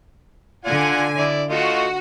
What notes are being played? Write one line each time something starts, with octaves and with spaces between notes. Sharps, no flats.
D3 F4 D5 F#5 G#5
E4 D5
A3 F4 F#4 D#5